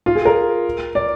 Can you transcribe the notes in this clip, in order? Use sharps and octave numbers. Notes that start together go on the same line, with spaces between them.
F4
G#4
A#4
D5